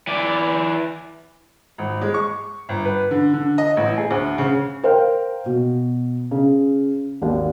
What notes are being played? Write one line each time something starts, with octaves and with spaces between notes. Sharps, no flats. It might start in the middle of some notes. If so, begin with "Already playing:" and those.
E3 D5
G#1
G#3
C#6
G1
B4
D3
D3
D#5
A1
G#4
D2
C#3
A#4 C5 F5 G5
B2
C#3
G#1 D#2